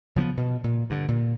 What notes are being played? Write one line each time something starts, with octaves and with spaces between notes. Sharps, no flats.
C#3 F3 A#3 B3
B2
A#2
G2 D3
A#2